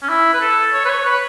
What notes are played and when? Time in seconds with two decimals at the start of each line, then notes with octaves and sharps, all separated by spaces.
0.03 C#4
0.09 E4
0.34 B4
0.40 A4
0.73 C#5
0.85 B4
0.89 C#5
1.05 B4